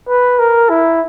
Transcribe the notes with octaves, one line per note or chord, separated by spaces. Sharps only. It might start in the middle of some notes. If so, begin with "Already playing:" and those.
B4
A#4
E4